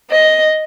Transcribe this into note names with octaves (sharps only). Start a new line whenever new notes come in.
D#5